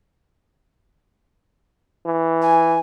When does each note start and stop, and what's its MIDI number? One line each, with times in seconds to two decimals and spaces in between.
2.06 2.79 52
2.41 2.79 80